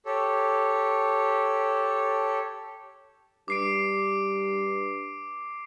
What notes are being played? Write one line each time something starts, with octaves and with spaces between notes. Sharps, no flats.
G4 A4 C#5
G2 D6 C7 D7